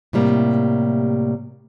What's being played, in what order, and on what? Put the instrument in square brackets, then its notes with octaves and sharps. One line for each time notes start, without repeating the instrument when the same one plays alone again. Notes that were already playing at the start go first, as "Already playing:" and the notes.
[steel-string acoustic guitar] A2 C3 G3 A#3